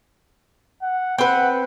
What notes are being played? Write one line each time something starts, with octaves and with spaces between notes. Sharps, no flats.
F#5
C4 B4 F#5